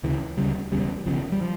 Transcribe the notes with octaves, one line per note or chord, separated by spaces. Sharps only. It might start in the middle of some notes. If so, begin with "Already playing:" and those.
D2 C#3 E3
D2 C#3 G3
E1 E2 C#3 G3
E1 E2 C#3 F3
G3
F3